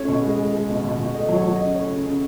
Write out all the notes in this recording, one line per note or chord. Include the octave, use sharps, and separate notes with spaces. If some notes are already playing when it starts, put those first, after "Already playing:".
Already playing: A3 C#4 C#5
B2
G#3
G#3
G#3
B2
B2
B2
A3 D#5
F#3
C#5
F#3
C#3 D#5
A3 C#5
C#3
C#3